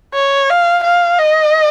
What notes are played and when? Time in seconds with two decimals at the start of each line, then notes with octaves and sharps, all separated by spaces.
0.14 C#5
0.50 F5
0.84 F5
1.19 D#5